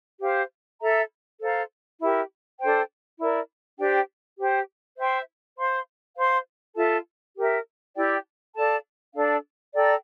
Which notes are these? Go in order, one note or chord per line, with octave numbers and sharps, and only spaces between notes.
G4 C5 F5
A4 E5 A#5
A4 C5 F5 A#5
E4 G4 A#4
D4 A4 C5 G5
E4 A#4 D5
D4 G4 C5 G5
G4 C5 G5
C5 E5 G5 C6
C5 F5 C6
C5 F5 C6
F4 A4 E5 A5
G4 A#4 E5
E4 G4 D5 G5
A4 D5 F5 A5
D4 A4 D5 F5
A4 D5 G5 A#5